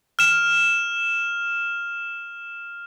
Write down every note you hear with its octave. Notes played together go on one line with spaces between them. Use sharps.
F6 E7